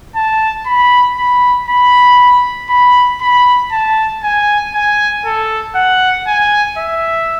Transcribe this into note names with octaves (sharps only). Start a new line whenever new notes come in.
A5
B5
B5
B5
B5
B5
A5
G#5
G#5
A4
F#5
G#5
E5